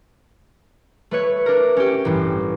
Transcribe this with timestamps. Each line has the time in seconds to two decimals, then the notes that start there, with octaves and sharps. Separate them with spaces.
1.11 A3 B4 C#5
1.46 D4 A#4
1.77 C#4 G4
2.05 A1 G2